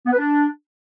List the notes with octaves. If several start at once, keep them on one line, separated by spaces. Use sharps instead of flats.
B3
B4
D4